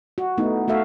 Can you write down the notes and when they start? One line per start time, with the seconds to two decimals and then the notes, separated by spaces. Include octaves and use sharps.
0.18 F#4
0.38 A3 B3 D#4 E4
0.68 A3 F#4 A4 E5 F5